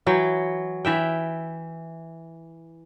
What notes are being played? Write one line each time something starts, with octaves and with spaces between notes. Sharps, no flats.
E3 F#3 G5
E3 E5 G5